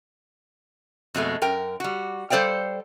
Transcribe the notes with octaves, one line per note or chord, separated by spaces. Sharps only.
F2 B2 G#3 A3
F#2 A#4 G5
G3 F#4
G3 A4 C5 D5 F5 G5